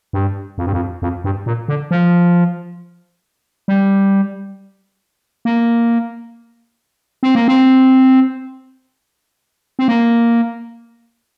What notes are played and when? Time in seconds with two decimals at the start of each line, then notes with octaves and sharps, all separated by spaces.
0.13 G2
0.58 F2
0.66 G2
0.73 F2
1.02 F2
1.24 G2
1.46 A#2
1.68 D3
1.91 F3
3.68 G3
5.45 A#3
7.23 C4
7.35 A#3
7.48 C4
9.79 C4
9.88 A#3